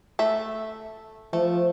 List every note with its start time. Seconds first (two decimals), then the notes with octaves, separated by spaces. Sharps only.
0.19 A3 E5
1.33 F3 A3